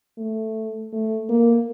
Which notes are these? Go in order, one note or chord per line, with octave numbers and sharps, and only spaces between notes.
A3
A3
A#3